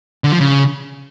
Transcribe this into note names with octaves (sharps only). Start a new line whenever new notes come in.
D3
F3
C#3